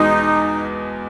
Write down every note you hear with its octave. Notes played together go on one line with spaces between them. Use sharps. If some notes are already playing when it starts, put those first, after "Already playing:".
Already playing: E2 B2 G#3 D#4